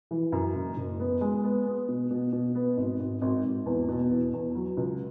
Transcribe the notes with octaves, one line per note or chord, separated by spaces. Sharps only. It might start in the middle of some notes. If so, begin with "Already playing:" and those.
E3
F#2
F#1
F#1
B3
G#3
B3
B3
B2
B2
B2
B3
G#1
G#1
G#1
G#1
E2
B2
E2
E2
F#3
C#2